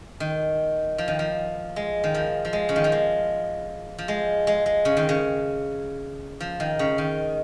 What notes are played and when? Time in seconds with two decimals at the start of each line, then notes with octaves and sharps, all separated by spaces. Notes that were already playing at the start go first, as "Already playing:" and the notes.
0.20 D#3
0.98 F3
1.08 D#3
1.19 F3
1.76 G#3
2.04 D#3
2.14 F3
2.45 F3
2.53 G#3
2.69 C#3
2.76 D#3
2.84 F3
2.92 G#3
3.98 F3
4.08 G#3
4.47 G#3
4.66 G#3
4.85 C#3
4.97 D#3
5.09 C#3
6.40 F3
6.60 D#3
6.79 C#3
6.98 D#3